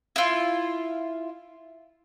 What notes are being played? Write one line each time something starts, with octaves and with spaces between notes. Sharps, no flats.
E4 F4